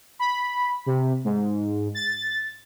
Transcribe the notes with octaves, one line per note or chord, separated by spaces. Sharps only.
B5
C3
G#2
A6